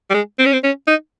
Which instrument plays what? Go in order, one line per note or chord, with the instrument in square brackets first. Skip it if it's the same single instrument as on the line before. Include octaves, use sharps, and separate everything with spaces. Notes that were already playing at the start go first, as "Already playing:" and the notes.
[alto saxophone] G3
G#3
C4
C#4
C4
C#4
D#4